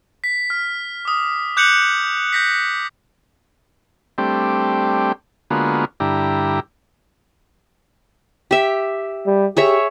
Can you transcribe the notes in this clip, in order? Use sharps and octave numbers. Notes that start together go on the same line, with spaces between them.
B6
F6
D6 D#6
D6 F#6 G6 C#7 F7 F#7
G6 A#6 B6
G3 A3 C4 D4 G4
D3 G#3 A#3 B3 F4 F#4
G2 D3 E4 G4 A#5
G4 E5
G3
G4 G#4 C#5 E5